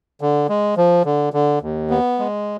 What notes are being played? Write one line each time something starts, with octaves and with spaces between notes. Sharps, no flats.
D3
G#3
F3
D3
D3
D#2
B3
G#3